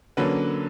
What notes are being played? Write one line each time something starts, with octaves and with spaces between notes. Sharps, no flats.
D3 F#3 A#3 C#4 B4